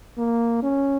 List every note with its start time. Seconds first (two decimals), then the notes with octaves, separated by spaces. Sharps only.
0.17 A#3
0.63 C#4